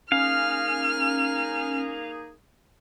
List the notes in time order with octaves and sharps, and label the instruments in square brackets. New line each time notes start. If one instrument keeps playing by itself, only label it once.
[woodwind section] A#3 D#4 G#4 [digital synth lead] C#4 [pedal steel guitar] F5 [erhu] F6